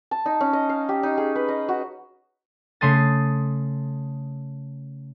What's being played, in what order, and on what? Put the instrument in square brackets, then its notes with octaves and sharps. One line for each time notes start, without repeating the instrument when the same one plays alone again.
[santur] A5
D#4
C#4
D#5
F5
G4
D#4
G#4
B4
D#5
F#4
[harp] C#3 A3 C6 D#6 A6